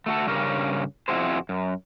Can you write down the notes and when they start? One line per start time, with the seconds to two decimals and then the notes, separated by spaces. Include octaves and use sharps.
0.06 A3 F#4 A4
0.27 G2 C#3 C#4 G4 A#4
1.08 F2 F3 E4 F#4 G#4 C5
1.49 F#2